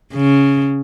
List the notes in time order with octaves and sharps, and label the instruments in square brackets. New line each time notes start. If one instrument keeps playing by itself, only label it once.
[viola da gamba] C#3